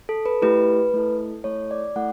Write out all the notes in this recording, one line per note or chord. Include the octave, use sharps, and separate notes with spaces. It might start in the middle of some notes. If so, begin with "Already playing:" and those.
A4
B4
A3 E4 G4 B4
A3 E4 A4
A3 E4 A4 C#5
D5
A3 E4 A4 F#5